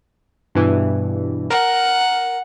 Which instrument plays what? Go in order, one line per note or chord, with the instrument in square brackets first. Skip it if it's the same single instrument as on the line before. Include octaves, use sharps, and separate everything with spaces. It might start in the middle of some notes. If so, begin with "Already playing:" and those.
[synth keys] G2 B2 E3
[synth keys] A#4 [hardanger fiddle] F#5